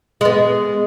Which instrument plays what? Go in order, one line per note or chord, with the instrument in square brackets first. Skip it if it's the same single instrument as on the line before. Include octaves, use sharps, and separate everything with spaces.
[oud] G#3 B3